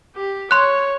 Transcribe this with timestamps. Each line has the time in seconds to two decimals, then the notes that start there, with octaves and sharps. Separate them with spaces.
0.16 G4
0.51 C#5 C6 F#6